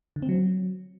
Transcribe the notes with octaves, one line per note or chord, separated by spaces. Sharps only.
D3
C4
F#3